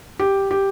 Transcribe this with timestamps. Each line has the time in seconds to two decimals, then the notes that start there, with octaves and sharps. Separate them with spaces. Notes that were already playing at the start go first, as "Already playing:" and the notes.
0.19 G4
0.51 G4